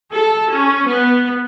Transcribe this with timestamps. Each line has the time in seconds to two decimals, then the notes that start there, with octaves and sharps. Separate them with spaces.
0.12 A4
0.50 C#4
0.87 B3